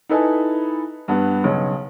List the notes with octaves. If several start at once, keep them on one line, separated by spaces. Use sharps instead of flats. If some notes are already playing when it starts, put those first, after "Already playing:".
D#4 E4 A4 B4 G#5
G2 B3
B1 C#3 C#4